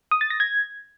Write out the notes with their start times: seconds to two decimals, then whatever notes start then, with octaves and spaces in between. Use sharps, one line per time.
0.11 D#6
0.21 A6
0.30 A#6
0.40 G#6